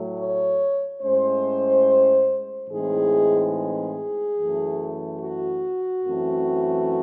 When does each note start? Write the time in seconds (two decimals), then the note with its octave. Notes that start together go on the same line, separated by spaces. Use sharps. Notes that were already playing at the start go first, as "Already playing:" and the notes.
Already playing: A2 F#3 A3
0.17 C#5
1.01 A2 G#3 C#4 C5
2.69 A2 E3 G#3 C4 D#4 G#4
3.54 G#4
4.37 F#2 E3 A3
5.21 F#4
6.05 F#2 E3 A3 C4